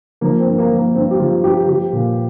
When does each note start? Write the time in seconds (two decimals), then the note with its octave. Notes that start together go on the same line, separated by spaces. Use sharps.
0.21 F3 A#3
0.40 C4
0.46 G2
0.58 A#3
0.71 F3
0.76 A#3
0.95 G2 C4
1.11 G4
1.19 F3 F4
1.43 G2 G4
1.67 F3 G4
1.93 A#2